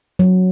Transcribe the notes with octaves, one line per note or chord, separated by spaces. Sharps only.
F#3